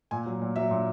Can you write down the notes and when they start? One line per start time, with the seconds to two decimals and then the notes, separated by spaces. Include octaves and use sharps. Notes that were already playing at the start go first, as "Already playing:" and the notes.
0.11 A#2 G#5
0.26 F#3
0.42 A#2
0.56 F#3 E5
0.71 A#2